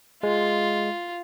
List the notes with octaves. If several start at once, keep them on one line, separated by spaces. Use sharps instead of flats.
G#3 F4